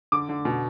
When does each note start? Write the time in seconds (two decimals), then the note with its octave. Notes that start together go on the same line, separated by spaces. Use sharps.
0.12 D3 D6
0.29 D3
0.45 B2